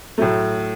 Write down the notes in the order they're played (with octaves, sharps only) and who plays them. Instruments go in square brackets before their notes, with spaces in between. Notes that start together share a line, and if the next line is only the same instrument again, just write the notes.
[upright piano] A2 F#3 A3